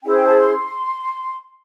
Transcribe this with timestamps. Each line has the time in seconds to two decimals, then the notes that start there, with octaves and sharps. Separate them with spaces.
0.03 C#4 E4 G#4 C5 G5
0.14 G5
0.25 A5
0.37 C6